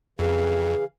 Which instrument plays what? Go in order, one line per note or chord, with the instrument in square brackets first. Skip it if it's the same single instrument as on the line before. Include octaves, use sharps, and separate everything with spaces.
[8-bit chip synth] F2 [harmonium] C#3 E3 F5 [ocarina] G#4